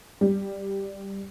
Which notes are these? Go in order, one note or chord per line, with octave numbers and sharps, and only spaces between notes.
G3